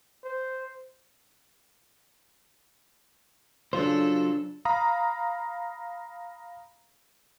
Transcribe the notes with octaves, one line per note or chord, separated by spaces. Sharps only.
C5
C#3 F#3 D4 F4 A4 C5
F5 A#5 B5 D#6